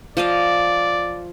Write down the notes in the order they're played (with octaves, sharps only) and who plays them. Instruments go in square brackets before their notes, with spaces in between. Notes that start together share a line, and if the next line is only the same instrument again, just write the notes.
[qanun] F3 D#5 F5 [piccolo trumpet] D5